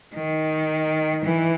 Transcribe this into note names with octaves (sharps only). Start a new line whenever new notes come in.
D#3
E3